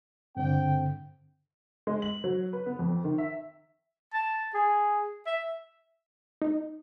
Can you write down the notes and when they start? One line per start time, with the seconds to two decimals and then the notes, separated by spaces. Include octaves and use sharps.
0.37 G2 D3 C4 G5
1.87 G#3
2.02 F#7
2.24 F#3
2.53 B4
2.66 B3
2.79 F2
3.04 D#3
3.18 E5
4.14 A5
4.54 G#4
5.26 E5
6.42 D#4